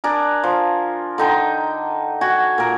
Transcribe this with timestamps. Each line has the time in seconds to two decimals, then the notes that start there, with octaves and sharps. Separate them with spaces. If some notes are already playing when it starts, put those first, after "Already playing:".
0.04 D4 G#4 A#4
0.44 F3
1.18 D3 D#4 G5
2.21 F#4 G#5
2.58 A#2 A#4